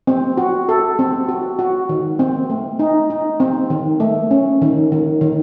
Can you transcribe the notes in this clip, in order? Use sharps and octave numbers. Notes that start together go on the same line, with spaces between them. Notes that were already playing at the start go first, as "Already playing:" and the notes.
C4
F#4
A4
C4
F#4
F#4
D#3
C4
A3
D#4
D#4
C4
D#3
A3
C#4
D#3
D#3
D#3